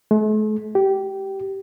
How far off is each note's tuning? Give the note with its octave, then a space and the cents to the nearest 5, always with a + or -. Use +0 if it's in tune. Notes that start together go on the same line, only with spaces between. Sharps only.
A3 -45
G4 -15